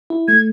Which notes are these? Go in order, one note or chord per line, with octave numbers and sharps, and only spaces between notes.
E4
A3 G#6